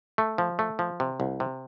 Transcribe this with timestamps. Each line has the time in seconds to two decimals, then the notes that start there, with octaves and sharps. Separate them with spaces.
0.18 A3
0.38 F3
0.59 A3
0.79 F3
1.00 C3
1.20 C2
1.40 C3